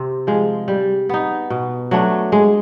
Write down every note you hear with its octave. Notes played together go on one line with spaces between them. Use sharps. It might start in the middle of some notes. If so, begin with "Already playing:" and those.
Already playing: C3 C4
F3 G#3
G3
B3 D#4
B2
F#3 A3 D4
G#3